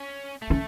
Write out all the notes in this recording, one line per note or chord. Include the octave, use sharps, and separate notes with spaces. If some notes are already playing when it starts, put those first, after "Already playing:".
Already playing: C#4
A3
C#4